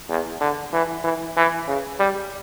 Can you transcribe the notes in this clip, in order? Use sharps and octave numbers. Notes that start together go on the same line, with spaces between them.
E2
D3
E3
E3
E3
C#3
G3